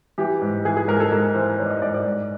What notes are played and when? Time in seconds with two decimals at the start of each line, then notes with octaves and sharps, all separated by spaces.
0.18 E3 G4
0.42 G#2
0.65 E3 G#4
0.77 G#4
0.88 G#2 A#4
1.00 A4
1.12 G#2 A#4
1.35 E3 C5
1.58 E3 C#5
1.66 D5
1.70 D#5
1.82 G#2 D5
1.94 D5
2.05 G#2